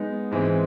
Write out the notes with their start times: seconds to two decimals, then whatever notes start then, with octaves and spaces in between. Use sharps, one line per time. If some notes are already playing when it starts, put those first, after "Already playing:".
Already playing: G#3 B3 D#4
0.31 G#2 E3 G#3 C4